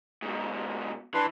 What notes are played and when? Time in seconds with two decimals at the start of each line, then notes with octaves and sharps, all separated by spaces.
0.22 G#2 B2
1.14 E3 D4 B4 C6